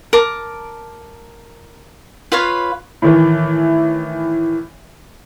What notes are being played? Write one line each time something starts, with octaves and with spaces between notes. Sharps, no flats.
A#4 A5 D6
F4 B4 C#5 F5
A2 D#3 E3